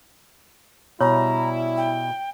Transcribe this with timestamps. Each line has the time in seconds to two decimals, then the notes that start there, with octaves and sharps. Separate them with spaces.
1.01 B2 G3 E4 C#5 A#5
1.77 G5